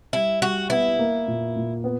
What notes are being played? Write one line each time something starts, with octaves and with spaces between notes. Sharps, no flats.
G3 E4
G3 F#4
B3 E4
A#3
A#2
A#2
B3